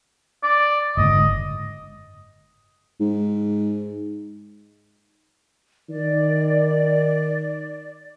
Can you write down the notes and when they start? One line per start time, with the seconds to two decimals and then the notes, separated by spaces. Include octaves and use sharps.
0.44 D5
0.97 F#1 G#2 D3 D#5
3.01 G#2
5.89 D#3 D5